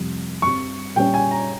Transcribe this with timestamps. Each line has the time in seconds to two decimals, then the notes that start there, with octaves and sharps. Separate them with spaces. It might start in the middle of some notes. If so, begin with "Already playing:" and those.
Already playing: F2 C3 G3
0.42 G2 G3 C4 C#6
0.95 A#2 G3 C#4 G5
1.14 G#5
1.31 A#5